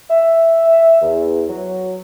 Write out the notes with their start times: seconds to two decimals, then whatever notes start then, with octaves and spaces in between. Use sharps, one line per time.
0.10 E5
1.02 E2
1.49 F#3